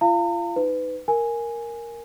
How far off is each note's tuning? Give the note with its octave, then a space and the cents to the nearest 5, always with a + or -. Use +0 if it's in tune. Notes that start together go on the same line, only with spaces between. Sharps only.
F4 -35 F5 -20 A#5 -45
D#4 +0 B4 +25
A#4 +0 G#5 +0